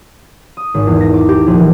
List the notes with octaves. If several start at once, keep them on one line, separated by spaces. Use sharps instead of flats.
D#6
G#1
E2
A#6
D6
G4
A#1
E3